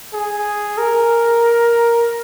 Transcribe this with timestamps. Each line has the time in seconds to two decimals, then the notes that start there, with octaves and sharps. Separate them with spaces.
0.13 G#4
0.78 A#4